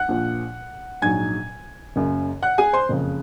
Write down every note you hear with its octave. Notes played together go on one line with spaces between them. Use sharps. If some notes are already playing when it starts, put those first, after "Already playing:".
Already playing: F#5 F#6
A#1 A#2 F3
A#1 G#2 F#3 G#5 G#6
F#1 F#2 C#3
F#5 F#6
G#4 G#5
C5 C6
F#1 F2 C#3